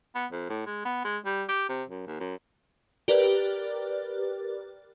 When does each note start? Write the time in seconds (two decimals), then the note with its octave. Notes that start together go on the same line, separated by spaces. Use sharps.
0.15 B3
0.32 F2
0.49 A2
0.66 G#3
0.85 B3
1.05 G#3
1.25 G3
1.49 G4
1.69 C3
1.89 F#2
2.06 D#2
2.20 F#2
3.08 G4 A#4 B4 D5